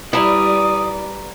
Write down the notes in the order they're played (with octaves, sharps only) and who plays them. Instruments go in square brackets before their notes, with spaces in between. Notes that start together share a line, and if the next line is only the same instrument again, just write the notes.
[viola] G3 D5 [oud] E4 [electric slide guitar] B4 A5 A#5 [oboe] D#6